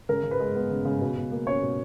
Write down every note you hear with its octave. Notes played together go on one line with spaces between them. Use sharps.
C#3 A#4
C#3
B4
G#3
B3
C#3
C#3
B2
B2
A#3
C#4 C#5
B2